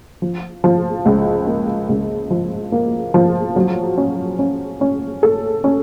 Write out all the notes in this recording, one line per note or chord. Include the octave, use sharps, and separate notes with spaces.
F3
F3
C#2
A#3
C#2
F3
A#3
F3
F#3
C#4
C#4
C#4
A4
C#4